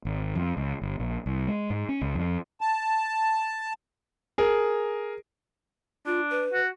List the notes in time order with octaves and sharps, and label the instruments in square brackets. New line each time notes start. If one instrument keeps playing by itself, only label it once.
[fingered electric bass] G#1
F2
C#2
G1
A#1
C2
G#3
G#2
C#4
C#2
F2
[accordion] A5
[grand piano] G#4 A#4
[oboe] D4 [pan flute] F4
[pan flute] B4
[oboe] F#4